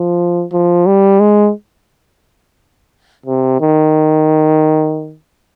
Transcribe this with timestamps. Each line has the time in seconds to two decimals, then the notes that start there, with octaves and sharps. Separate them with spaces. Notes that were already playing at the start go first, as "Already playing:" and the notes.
Already playing: F3
0.52 F3
0.86 G3
1.20 G#3
3.26 C3
3.61 D#3